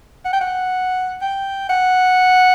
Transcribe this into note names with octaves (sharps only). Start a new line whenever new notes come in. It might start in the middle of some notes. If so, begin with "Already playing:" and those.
F#5
G5
F#5
G5
F#5